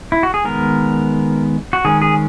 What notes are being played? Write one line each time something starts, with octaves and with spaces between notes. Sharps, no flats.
E4
F#4
G#4
D#3 G#3 B3 A#4
F#4
D#3 G#3 C#4 G#4
G#4